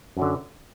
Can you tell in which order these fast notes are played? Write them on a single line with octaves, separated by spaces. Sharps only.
F#2 F#3 D3